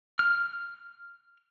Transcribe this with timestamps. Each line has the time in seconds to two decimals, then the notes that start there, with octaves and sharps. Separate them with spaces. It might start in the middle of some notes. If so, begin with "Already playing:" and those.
0.19 F6